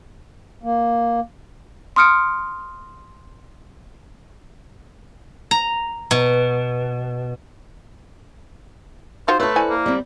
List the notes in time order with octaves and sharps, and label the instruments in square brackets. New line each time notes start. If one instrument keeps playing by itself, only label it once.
[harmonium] A#3
[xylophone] C6 D#6 F6 C#7 D7
[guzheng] A#5
B2
[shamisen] D#4 F4 F#4 [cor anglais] C5
[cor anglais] A3 [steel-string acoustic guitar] A4 B4 [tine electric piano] C#5 E5 C6
[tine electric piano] E4 C5 D5 [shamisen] G#5
[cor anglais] A#3
[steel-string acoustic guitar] G3 C4